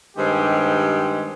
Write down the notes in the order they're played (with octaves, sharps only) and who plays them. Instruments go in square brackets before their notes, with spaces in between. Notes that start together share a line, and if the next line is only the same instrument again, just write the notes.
[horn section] G2 D#3 G#3 C4 G4